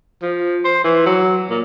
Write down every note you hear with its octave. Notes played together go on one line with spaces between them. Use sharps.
F3
C5
E3
F#3
A#2